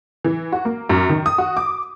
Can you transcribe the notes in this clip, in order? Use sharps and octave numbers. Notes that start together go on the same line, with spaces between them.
E3
F#4
A#3
F#2
D#3
D#6
F#4
D6